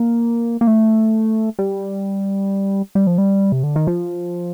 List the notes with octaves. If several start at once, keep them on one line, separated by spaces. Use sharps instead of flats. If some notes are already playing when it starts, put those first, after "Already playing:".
Already playing: A#3
A#3
A3
G3
G3
F3
G3
C3
D3
D#3
F3